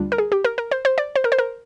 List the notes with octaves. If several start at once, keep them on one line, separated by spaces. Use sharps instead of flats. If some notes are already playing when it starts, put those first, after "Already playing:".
Already playing: D2 D3 G3 D4 F4
A#4
G#4
G4
A#4
A#4
C5
C5
D5
C5
A#4
C5
A#4